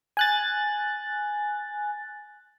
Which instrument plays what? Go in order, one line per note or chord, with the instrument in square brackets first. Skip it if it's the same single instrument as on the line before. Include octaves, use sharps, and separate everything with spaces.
[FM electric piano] G#5 F#6 A6